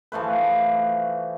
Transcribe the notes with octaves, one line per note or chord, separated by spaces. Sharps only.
E3 F3 A3 B4